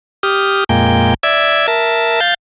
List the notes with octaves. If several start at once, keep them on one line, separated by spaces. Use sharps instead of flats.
G4 D#6 F6
F2 A#2 G#3 A#3 G5
D5 E5 E6 G#6
A#4 E5 A5
F5 G6 A6